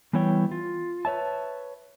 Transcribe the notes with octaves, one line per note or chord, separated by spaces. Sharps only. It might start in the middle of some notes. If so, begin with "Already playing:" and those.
E3 G3 B3 E4 C#5 G5
F4
B4 C#5 E5 A5